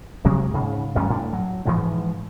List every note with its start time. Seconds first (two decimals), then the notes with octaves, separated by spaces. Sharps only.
0.25 C3 F#3 G#3 A#3
0.54 G#2 C#3
0.95 A1 F#2 G3 C#4
1.10 A2 D4
1.33 F#3
1.65 G#2 E3 F3 G#3